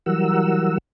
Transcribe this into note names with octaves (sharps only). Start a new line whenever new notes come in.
E3 F#3 G3 A#4 F#5 E6